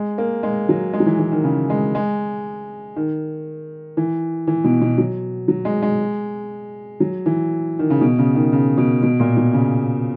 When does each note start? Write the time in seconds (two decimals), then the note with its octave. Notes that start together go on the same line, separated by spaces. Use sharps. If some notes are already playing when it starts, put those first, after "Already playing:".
Already playing: G#3
0.18 A#3
0.43 G#3
0.69 F#3
0.93 G#3
1.00 F#3
1.06 E3
1.19 E3
1.32 D#3
1.44 C#3
1.70 G#3
1.95 G#3
2.96 D#3
3.97 E3
4.47 E3
4.64 B2
4.81 B2
4.98 F#3
5.48 F#3
5.65 G#3
5.82 G#3
7.00 F#3
7.26 E3
7.79 D#3
7.90 C#3
8.01 B2
8.19 C#3
8.35 D#3
8.53 C#3
8.78 B2
9.03 B2
9.20 A#2
9.37 B2
9.53 C#3